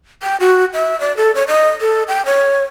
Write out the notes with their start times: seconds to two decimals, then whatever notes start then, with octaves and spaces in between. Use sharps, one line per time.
0.23 G5
0.40 F#4
0.73 E5
1.01 D5
1.17 A4
1.35 C#5
1.48 D#5
1.81 A4
2.08 G5
2.26 C#5